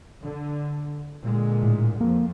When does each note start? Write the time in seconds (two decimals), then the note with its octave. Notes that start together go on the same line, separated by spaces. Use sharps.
0.23 D3
1.24 A#2 D3 G#3
1.63 A2
2.01 F2 A#3